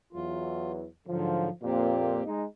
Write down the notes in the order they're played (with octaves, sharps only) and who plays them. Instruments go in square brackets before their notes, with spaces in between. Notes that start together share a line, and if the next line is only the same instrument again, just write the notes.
[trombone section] E2 E3 F#3 [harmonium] F4
[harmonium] G#2 D3 F#3 [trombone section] F3
[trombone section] F2 A#2 [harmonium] A#3 C4 G4
[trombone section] G#3 D#4